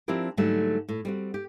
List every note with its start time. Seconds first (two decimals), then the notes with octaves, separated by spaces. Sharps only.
0.08 F3 C4 D4 E4 G4 A#4
0.37 G#2 D3 F#3 G3 A3
0.89 A2
1.05 G3 C4 F#4
1.34 G4